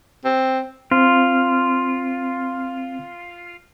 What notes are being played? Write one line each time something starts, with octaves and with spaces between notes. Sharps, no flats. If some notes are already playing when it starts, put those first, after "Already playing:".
C4
C4 F4